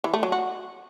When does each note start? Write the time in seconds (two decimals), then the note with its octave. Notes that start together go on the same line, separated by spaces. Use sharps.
0.04 E3
0.14 A3
0.23 F#3
0.32 F#4